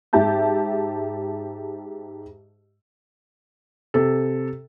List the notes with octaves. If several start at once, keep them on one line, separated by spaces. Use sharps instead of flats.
G#2 G4 E5 A5 G6
C3 A4